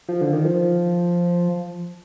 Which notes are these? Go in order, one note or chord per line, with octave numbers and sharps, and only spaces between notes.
F3
D3
D#3
F3